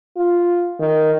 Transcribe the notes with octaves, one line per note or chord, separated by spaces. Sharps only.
F4
D#3